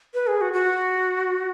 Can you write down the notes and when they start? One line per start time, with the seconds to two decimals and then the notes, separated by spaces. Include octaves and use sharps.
0.14 B4
0.27 G#4
0.41 F#4
0.53 F#4